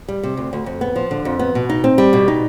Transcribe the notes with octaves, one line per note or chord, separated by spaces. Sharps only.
G3
C3
D2
D2
F2
B3
F3
D3
F2
B3
B2
D#4
C4
G3
B2
D#4